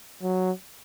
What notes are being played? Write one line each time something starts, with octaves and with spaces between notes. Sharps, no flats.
F#3